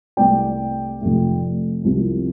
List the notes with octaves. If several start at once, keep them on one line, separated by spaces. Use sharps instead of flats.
C2 C3 A3 C4 D5 G5
F1 F2 C3 A3
C2 C3 F3 C4